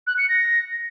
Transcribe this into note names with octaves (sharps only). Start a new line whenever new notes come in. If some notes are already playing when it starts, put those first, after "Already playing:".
F#6
C#7
A#6